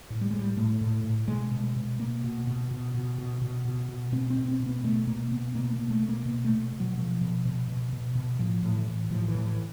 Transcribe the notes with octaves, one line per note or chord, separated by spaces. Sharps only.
A2
G3
A2 G#3
G3
A2 A3
A2
A2
B2 G#3
B2
G#3
B2
B2 A#3
B2
B2
B2
B2
B2
B2
B2
B2
B2 C4
C4
B2
C4
B2
B3
B2 A3
B2 A#3
B2 B3
B2 A#3
A#3
B2
A3
B2
A#3
B2
A3
B2
B2
F#3
B2 F3
B2
B2
B2
B2
B2
A2 F3
A2
E3
A2
A2 F3
E3
A2
E3